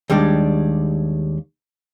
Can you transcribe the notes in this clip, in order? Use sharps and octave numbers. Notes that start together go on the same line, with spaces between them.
D#2 G3 G#3 D4